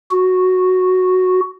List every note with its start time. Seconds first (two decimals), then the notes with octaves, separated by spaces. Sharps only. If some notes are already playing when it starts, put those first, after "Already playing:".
0.11 F#4